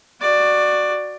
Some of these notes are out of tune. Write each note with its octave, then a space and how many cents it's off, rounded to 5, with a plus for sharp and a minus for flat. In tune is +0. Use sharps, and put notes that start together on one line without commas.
F#4 +0 D5 +15